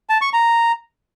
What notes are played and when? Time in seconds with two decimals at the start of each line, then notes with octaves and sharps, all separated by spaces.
0.09 A5
0.21 C#6
0.33 A#5